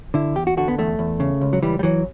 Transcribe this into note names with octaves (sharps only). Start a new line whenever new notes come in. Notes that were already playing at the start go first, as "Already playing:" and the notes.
D3 E4
E2 G4
F#4
D3 F#4
B3
E2 A3
E2
C#3
C#2
F#3
E3 G3
G3
E3 F#3